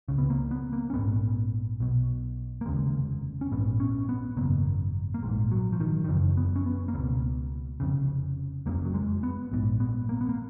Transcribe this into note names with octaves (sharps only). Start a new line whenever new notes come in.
C#2 C#3
B3
A#3
B3
A#3
C#4
A#1 G#2 B3
B1 B2
A#3
F1 D#2 C#3 G#3
C#4
A#1 G#2 B3
C#4
B3
G#1 F#2 C#3 A#3
A#3
A#1 G#2 G#3
F#3
F3
D#3
D#3
F#1 F#2 C#3 F3
B3
C#4
B3
A#3
C#2 B2 B3
F1 F2 C#3
F#1 F2 C#3 A#3
F#3
G#3
B3
A#1 G#2
B3
A#3
B3
A#3